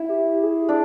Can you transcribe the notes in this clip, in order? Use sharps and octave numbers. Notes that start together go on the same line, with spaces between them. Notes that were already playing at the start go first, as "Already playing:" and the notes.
Already playing: E4
G4
G#4
D4